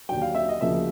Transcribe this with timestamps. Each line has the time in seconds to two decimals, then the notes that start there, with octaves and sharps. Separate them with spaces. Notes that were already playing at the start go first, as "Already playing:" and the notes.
0.09 D#2 D3 F#3 G5
0.21 F5
0.34 E5
0.49 D#5
0.61 D2 C#3 F3 A#3 E5